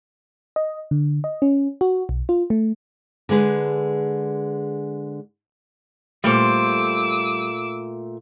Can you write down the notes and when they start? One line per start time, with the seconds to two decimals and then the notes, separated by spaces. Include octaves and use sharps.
0.56 D#5
0.91 D3
1.24 D#5
1.42 C#4
1.81 F#4
2.09 B1
2.29 F4
2.50 A3
3.29 D3 G#3 G#4 B4
6.24 A#2 G3 A3 C5 D6 E6